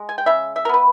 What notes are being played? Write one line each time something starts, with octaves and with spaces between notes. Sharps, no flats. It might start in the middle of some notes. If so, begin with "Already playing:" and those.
Already playing: G#3
G#5
G5
C#3 E5
E5
A#4
B3 B4